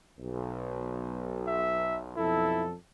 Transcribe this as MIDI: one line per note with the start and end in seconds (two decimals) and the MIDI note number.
0.19 2.13 35
1.47 2.00 76
2.17 2.74 35
2.17 2.74 41
2.17 2.63 64
2.17 2.74 69